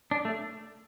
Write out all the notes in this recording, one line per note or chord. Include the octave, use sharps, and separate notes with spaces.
D4
A3